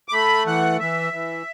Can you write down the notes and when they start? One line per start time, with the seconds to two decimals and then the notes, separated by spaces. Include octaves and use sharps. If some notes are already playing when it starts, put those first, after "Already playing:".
0.08 D6
0.13 A3 B5
0.46 E3 F#5
0.80 E3 E5
1.13 E3